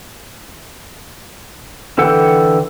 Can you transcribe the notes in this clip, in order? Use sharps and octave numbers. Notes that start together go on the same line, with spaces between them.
D3 E3 A4 F#5 G5